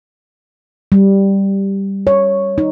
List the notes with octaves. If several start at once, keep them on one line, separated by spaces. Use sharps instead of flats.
G3
C#5
D#4